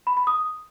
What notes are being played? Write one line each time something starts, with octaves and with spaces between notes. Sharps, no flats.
B5
B5
D#6